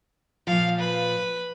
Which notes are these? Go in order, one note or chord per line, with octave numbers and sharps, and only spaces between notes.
A#2 F3 F5
B4